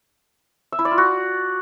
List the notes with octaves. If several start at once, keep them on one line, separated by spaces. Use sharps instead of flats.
E5
E4
D5
F4
F#4